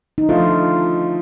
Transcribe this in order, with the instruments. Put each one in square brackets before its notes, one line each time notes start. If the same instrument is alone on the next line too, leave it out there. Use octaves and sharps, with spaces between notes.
[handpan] D#4
[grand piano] D3 F3 A3 D#4 [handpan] F4